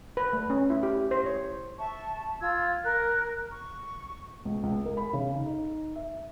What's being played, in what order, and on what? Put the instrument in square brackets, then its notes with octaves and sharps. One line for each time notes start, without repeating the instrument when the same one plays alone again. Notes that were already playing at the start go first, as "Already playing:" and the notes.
[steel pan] B4
A3
C#4
E4
G4
C5
C#5
[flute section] E5 A5 C#6
F4 E6 G#6
A#4 F#6
C#6
[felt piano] C#2
C#2
A#4
B5
C#3
D#4
D#4
E5